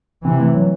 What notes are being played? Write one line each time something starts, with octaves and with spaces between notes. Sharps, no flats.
C3 E3 C4
A3
F#3